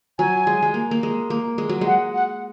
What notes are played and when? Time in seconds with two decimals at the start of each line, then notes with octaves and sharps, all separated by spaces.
0.19 F#3 G#5
0.47 G#3
0.62 G#3
0.74 A#3
0.91 A#3
1.03 G#3
1.30 A#3
1.58 G#3
1.69 F#3
1.81 G#3
1.86 F#5
2.14 F#5